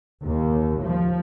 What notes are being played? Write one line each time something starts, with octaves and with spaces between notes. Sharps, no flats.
D#2
F3